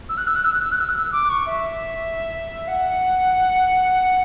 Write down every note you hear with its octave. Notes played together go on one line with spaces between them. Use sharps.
E6
F#6
E6
F#6
E6
F#6
E6
F#6
E6
F#6
E6
D6
C#6
E5
F#5